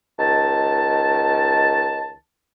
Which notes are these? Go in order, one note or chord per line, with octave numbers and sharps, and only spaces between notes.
C#2 D#3 A5